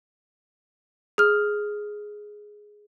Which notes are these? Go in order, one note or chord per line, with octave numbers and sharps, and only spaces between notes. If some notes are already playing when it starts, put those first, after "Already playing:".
G#4 F6